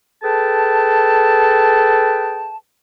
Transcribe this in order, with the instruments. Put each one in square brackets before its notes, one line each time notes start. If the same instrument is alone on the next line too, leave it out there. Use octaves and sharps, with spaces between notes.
[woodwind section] G#4 A4 B4 G5 A5